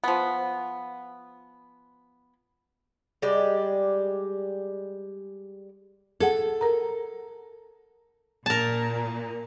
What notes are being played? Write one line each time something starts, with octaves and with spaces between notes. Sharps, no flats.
F3 B3
G3 G#3 G4 D5
G#4 A4 F#5
A#4 A#5
A#2 A#4 A5